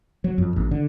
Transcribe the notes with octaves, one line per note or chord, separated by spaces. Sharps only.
F#3
F2
A1
D3